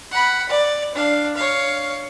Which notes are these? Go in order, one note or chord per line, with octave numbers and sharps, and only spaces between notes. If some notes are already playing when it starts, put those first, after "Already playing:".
F#5 B5
D5
D4 F5
C#5 F5